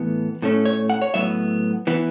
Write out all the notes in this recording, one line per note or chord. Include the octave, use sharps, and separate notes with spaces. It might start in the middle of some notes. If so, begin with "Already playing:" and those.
Already playing: A2 E3 B3
A2 A3 C#4
C#5
F#5
C#5
A2 F#3 B3 E5
E3 B3